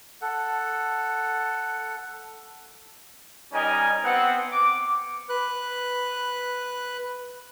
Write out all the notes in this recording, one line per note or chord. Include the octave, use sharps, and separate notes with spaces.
A4 F#5
G3 C#4 D#4 A#4 D#5 G#5
B3 C4 F#5
D6
B4 F#6